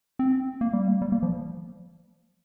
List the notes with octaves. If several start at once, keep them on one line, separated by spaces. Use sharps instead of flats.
C4
A#3
G3
A#3
G3
A#3
F3